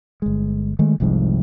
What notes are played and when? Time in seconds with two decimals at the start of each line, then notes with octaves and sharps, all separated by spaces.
0.22 G1 G#3
0.79 D#3 G#3 A3
1.00 F1 C2 F2 G#2